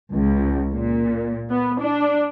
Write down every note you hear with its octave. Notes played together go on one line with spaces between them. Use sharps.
C#2
A#2
B3
D4